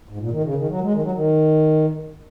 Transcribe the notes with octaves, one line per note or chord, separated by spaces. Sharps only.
G#2
A#2
D#3
C#3
D#3
F#3
G#3
D#3
F#3
D#3